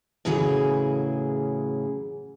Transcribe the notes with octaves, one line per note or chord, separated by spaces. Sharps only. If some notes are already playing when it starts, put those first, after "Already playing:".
A2 C#3 E3 F#3 G#4